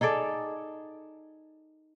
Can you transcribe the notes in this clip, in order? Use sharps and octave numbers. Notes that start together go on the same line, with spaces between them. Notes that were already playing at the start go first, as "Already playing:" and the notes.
D#4 G#4 A4 D5